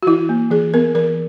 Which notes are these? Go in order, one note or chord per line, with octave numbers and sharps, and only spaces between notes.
F#4
E3 E4
A#3
E3 G#4
B3 A#4
E3 A#4